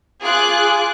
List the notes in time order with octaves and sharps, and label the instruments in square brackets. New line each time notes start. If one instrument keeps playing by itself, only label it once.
[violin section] F4 G#4 D6 F#6